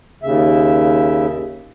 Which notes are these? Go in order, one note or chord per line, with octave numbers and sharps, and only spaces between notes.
D#2 C#3 E5